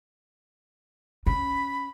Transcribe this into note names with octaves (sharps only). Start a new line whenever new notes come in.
C#4 B5